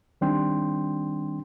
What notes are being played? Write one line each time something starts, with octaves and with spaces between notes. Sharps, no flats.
D#3 G3 C4 D4 G5 C6